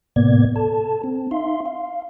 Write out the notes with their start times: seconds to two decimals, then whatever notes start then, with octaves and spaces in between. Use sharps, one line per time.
0.16 A2 C3 A#3 B3 D5 G#6
0.56 A4 A5
1.04 C4
1.31 D#4 E5 F5 C6
1.66 F5